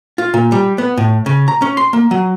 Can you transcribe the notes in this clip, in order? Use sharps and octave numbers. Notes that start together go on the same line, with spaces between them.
F4
A#2
G3
B3
A2
C#3
A#5
C#4
C6
A#3
F#3